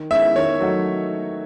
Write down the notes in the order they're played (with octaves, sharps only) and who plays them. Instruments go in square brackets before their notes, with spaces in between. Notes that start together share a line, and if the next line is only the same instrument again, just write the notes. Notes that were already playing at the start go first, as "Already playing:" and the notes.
Already playing: [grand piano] D#3
[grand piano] G#3 C#4 E4 [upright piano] E5
[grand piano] D#3 [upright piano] C#5
[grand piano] F#3 A3 D#4 F#4